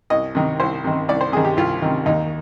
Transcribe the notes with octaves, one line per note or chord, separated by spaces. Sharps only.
C2 D#5
C3 D#3
C2 C5
C3 D#3
C2 D5
C5
C3 D#3 G#4
G4
C2 F4
C3 D#3
D#2 D#4